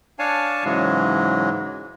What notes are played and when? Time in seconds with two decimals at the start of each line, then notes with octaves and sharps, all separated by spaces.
0.19 D4 C#5 F5 G#5 A5
0.64 G#2 C#3 E3 F#3 G#3